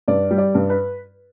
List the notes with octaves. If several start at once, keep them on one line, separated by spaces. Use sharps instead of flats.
G2 D5
G3
D5
G2
B4